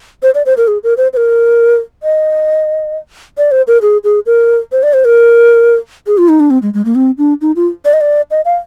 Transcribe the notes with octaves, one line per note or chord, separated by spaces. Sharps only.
C5
D5
C5
A#4
G#4
A#4
C5
C5
A#4
D#5
D5
C5
A#4
G#4
G#4
A#4
C5
D5
C5
A#4
G#4
F4
D#4
D4
C4
G#3
G#3
A#3
C4
D4
D#4
F4
D5
D#5
D5
D#5
F5